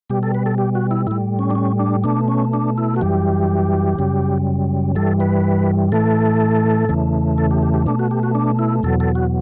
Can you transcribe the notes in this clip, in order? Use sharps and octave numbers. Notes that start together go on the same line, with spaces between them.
B2 G3 G4
A4
B4
A4
G4
F#4
E4
A2 G3 E4
C#4
D4
C#4
D4
B2 A3 D4
C#4
D4
E4
F#4
F#2 E3 G3 G4
F#2 C#3 G3
G2 E3 G3 A4
B4
A2 E3 A3 A4
E2 C#3 E3 A3
A4
G4
G4
G4
B2 A3 D4
F#4
G4
F#4
D4
E4
E2 B2 F#3 A4
A4
F#4